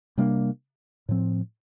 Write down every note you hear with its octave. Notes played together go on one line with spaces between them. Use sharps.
C3 G3 A#3 D4
A2 F3 C4